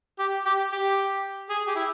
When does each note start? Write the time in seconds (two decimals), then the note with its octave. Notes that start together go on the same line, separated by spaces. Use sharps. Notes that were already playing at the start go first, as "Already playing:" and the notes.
0.19 G4
0.45 G4
0.72 G4
1.50 G#4
1.67 G4
1.76 E4